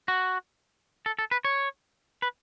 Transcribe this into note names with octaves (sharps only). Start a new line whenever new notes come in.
F#4
A4
A4
B4
C#5
B4